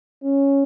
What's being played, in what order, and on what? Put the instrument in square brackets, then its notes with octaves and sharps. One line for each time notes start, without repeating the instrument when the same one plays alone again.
[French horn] C#4